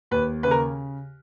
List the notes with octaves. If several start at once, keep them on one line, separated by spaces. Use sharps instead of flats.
D#2 B4
C#3 B4
A#4